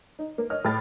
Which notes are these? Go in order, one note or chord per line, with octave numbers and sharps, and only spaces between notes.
D#4
A#3
C#5 D#5 F6
A2 G5 F6 A6